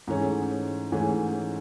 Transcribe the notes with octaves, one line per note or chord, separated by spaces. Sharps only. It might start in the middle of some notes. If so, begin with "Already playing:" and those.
G#2 E3 A3 C#4 G#4
G#2 E3 A3 C#4 G#4